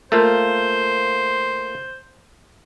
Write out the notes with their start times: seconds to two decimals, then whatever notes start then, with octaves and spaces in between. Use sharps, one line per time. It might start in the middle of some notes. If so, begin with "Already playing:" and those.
0.12 A3 A#3 F4 C5